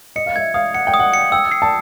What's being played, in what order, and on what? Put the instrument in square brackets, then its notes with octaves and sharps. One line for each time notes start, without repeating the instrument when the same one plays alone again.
[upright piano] D#5 [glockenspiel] C#7
[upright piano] F5
[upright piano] E5 [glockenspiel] G#6
[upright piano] F5 [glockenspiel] D#6
[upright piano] F#5 [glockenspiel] C#7
[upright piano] G5
[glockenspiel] D#6
[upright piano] F#5
[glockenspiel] C#7
[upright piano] G5 [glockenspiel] E6
[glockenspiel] C7
[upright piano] A5